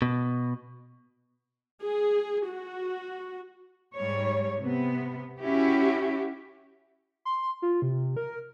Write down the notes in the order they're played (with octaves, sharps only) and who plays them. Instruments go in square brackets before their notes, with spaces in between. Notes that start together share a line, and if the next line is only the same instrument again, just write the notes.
[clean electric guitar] B2
[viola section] G#4
F#4
[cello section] G#2 G3 C#5
C3 B3
C#4 E4 F#4 G4
[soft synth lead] C6
F4
C3
A#4